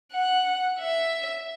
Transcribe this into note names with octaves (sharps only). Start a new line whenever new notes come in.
F#5
E5